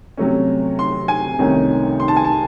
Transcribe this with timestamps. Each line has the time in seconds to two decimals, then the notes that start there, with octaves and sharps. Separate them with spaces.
0.17 C3 F#3 A3 C#4
0.79 C6
1.08 G#5
1.39 C2 C3 D#3 A3 C#4
2.00 C6
2.08 A5
2.16 G#5
2.25 A5